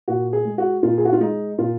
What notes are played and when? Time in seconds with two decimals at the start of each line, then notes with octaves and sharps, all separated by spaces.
0.08 A#2 F#4
0.33 G#4
0.45 G#3
0.58 F#4
0.83 A#2 F4
0.98 G#4
1.05 F#4
1.13 F4
1.20 G#3 D#4
1.58 A#2 F4